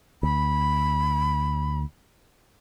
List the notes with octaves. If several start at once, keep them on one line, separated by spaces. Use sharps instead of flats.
D2 B5